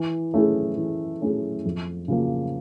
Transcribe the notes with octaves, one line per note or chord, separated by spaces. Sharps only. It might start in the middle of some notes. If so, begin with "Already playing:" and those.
Already playing: E3
A3 C#4 E4 G#4
E3
A3 C#4 E4 G#4
F2
C#3 F3 A#3